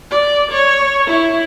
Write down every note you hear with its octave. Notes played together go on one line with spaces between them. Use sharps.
D5
C#5
E4